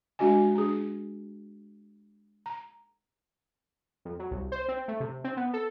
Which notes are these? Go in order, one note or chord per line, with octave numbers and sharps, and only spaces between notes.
G#3 D4 F#4 D#5 G#5
D4 G#4
A#5
F2
F#3
C2
C5
C4
A3
C3
C4
B3
A4